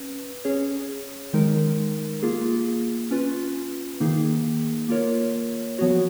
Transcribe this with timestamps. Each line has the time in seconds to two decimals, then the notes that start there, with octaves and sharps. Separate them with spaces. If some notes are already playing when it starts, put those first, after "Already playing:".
Already playing: C#4 B4
0.45 C#4 G#4 C#5
1.33 D#3 G#3 D#4 A#4
2.23 A#3 F4 G#4
3.11 C#4 F4 B4
4.00 D#3 A#3 D#4 G#4
4.89 A#3 F4 A#4 C#5
5.78 F3 B3 F#4 C#5